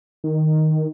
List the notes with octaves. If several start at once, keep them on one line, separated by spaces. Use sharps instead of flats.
D#3